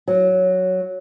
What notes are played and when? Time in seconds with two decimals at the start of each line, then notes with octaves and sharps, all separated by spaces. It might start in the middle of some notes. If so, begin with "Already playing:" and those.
0.08 F#3